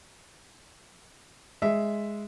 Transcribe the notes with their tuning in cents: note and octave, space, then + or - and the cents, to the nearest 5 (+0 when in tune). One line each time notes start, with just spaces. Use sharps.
G#3 +0 E5 +0